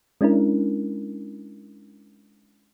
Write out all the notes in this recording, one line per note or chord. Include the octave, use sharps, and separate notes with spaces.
G#3 C#4 D4 E4 A#4